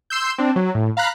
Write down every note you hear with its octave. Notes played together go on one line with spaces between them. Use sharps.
C6 E6 G6
C4 D4
F#3
A2
F5 A#5 B5 F#6